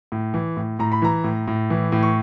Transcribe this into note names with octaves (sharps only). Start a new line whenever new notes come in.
A2
E3
A2
A2 A#5
B5
E3 A#5
A2
A2
E3
A2
C#6